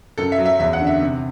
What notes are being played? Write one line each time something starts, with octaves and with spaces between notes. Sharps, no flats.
F#2 A4
E5
F#3
E5
E2 E5
F#5
D3
E5
C3